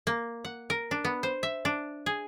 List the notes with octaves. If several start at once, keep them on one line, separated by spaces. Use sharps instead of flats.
A#3
F#5
A#4
D4
B3
C5
E5
D4
G#4